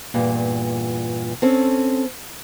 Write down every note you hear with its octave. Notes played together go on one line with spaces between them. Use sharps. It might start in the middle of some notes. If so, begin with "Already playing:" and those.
E2 G2 A#2
C4 C#4 A4